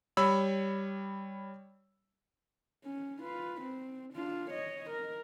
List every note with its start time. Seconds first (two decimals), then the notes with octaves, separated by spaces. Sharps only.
0.17 G3 C#5 B5 E6
2.84 C#4
3.21 F4 B4
3.62 C4
4.14 D4 F4
4.50 C#5 D#5
4.91 A#4